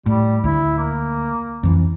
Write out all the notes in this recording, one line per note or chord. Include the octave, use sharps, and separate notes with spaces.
A2 G3
D2 E4
A#3
F2 E3